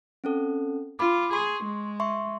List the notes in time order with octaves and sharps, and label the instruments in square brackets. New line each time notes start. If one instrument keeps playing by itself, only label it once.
[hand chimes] C4 C#4 A4
[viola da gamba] F4 [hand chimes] B5 D6
[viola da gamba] G#4 [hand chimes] C6 C#6
[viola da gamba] G#3
[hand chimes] E5 C6 C#6